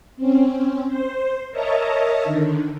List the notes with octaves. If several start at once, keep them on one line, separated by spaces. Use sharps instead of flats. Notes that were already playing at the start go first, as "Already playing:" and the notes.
C4 C#4
C5
A#4 C#5 D#5 E5 A5 A#5
D3 D#3